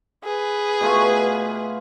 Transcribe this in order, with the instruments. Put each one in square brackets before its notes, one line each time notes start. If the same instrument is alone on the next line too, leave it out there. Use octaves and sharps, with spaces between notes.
[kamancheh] G#4 B4
[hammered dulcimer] B2 A3 F4